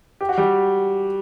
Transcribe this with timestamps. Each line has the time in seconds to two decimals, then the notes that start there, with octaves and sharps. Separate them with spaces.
0.21 G4
0.29 F#4
0.38 G3 G4